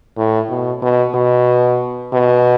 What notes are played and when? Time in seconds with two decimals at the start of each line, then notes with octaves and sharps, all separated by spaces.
0.17 A2
0.49 B2
0.82 B2
1.14 B2
2.13 B2